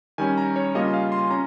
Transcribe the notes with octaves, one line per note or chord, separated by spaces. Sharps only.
D#3 G3 C#4 G#5
A#5
C#5
C#3 G3 A#3 C#4 F4 D#5
F5
C6
C#4 A#5